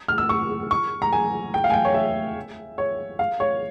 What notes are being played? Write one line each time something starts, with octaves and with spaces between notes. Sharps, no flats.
F6
E6
C#6
C#6
A#5
G#5
G5
F5
G#5
G5
C#5
E5
C#5
F5
C#5